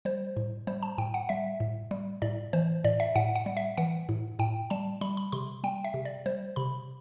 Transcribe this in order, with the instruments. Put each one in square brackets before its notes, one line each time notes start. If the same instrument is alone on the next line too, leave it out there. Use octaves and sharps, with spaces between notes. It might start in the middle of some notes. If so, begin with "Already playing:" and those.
[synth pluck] G3 C5
A2
G3 C5
A5
A2 G5
F#5
G3 E5
A2
G3
A2 D5
E3 C5
A2 D5
E5
A2 F#5
F#5
G3
E5
E3 F#5
A2
A2 G5
G3 A5
G3 B5
B5
C3 C6
G3 G5
E5
C3
D5
G3 C5
C3 B5